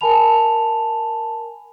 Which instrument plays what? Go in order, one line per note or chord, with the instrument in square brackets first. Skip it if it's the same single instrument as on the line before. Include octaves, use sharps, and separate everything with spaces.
[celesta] A#4 G#5 A5 B5 F7